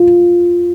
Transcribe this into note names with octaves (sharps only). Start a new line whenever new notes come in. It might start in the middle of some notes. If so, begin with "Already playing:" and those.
Already playing: F4